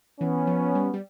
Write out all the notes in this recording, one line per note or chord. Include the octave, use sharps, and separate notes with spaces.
E3 B3 C#4
F3
G3
G3